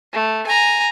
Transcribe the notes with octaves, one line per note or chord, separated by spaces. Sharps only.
A3
G#5 A#5